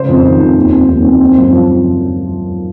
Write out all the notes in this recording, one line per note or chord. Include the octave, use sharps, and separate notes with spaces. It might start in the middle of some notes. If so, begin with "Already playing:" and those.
Already playing: C#3 C#4 C5
F2
D#3
F2
D#2
C4
D#2
C4
C4
F#2
F3